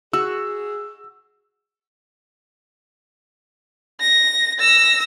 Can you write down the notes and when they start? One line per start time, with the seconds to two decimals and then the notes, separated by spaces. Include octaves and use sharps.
0.13 F#4 G#4 E6
4.01 A#6
4.59 E6 A#6